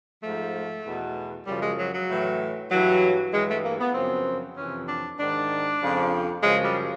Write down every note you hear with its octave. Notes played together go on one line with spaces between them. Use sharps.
G#2 F3 A3
E2 B2
F#2 C#3 F3 G3
G#3
F#3
F#3
A2 E3
G2 E3 F#3
G2 E3 G#3
A3
A#3
B3
F#2 C#3 F3 C4
F2 C3 E3 C#4
D4
G#2 D#3 D4
F2 C#3 F3
F#2 C#3 F3 G#3
G3